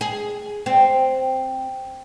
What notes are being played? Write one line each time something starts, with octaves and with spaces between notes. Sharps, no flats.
G#4
C4